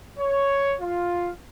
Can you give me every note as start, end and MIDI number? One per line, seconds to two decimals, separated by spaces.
0.19 0.75 73
0.81 1.31 65